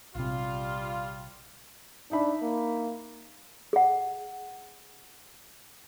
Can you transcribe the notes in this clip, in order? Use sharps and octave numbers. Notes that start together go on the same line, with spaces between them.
A#1 C3 G3 F4
D4 D#4 E5 B5
A#3
G#4 F#5